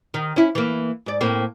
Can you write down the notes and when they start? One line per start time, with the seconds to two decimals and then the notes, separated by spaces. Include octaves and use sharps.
0.14 D#3
0.36 C#4 E4
0.55 E3 A#3
1.06 G#2 D5
1.21 A2 A#3 C4